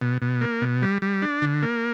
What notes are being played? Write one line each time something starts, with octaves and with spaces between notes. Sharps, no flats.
B2
B2
A#3
B2
G3
G3
D4
D3
A#3